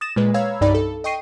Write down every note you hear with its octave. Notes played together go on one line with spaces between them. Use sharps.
D#6 A6 A#6 E7
A#2 G#3 B4
C#5 F5 A#5 B5 E6 G#6
C2 G2 D#4 D5 B5
A4
D#5 G5 C#6 C7 D#7